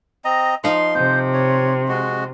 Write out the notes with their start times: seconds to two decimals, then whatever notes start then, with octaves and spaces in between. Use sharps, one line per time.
0.25 C4 D#5 A#5
0.64 F3 D#4 F5 C6
0.95 C3 C5
1.34 C#5
1.88 G#3 F#4